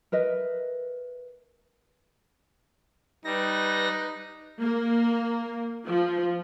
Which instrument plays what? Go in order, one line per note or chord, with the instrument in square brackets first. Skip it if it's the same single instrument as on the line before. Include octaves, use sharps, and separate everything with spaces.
[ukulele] A#4 B4 D#5 E5
[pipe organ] G3 A#6 [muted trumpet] D#4 [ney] B4
[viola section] A#3
F3